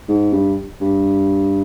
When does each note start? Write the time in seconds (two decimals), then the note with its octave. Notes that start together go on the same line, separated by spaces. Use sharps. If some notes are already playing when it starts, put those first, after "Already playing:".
0.09 G#2
0.33 G2
0.81 G2